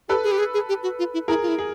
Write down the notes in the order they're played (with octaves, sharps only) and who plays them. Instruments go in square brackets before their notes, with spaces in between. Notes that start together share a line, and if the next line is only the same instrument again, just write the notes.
[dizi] G4 [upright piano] A4 B4
[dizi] G#4
G4
G#4
G#4
G4
F#4
F4
E4
[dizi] E4 [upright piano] G#4 A#4
[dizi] F4
E4
[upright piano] G#4